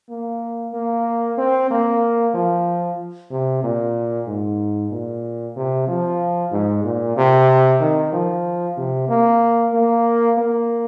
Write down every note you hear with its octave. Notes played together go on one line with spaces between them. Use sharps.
A#3
A#3
C4
A#3
F3
C3
A#2
G#2
A#2
C3
F3
G#2
A#2
C3
D#3
F3
C3
A#3
A#3
A#3